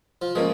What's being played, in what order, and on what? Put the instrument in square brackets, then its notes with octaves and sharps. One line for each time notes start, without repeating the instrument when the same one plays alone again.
[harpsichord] F3 F4
[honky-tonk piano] F3 A#3 C#4 [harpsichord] G#3 G#4